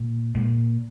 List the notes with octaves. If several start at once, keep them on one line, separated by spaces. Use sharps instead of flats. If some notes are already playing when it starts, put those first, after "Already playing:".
Already playing: A#2
A#2 G#3